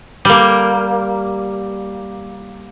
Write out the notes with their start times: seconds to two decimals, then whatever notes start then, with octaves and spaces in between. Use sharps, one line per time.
0.25 G3 A#3